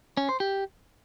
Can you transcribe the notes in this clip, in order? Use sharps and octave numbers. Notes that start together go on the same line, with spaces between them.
C#4
C5
G4